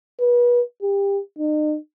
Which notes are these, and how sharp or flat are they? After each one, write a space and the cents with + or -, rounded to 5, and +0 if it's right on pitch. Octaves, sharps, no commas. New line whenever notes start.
B4 -30
G4 +25
D#4 -40